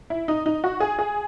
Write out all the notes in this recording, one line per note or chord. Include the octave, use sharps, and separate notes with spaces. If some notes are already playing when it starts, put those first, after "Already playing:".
E4
D#4
D#4
F#4
G#4
G#4